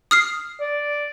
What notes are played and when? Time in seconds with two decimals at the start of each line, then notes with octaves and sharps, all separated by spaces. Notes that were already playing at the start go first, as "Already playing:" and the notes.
0.11 D#6 F6 C7
0.60 D5